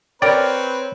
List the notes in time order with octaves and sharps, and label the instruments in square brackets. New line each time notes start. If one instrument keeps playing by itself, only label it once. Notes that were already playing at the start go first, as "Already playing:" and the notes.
[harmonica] C4 B4 [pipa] G4 A#4 [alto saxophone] C#5 [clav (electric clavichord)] D5